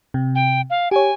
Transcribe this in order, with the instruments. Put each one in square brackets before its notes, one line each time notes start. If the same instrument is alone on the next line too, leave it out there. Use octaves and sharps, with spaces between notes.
[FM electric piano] C3
[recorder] G5
F5
[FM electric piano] G4 C#5 [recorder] G#5